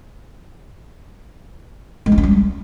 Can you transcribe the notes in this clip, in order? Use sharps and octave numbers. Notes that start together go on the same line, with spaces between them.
G#3
D4
C#4
G3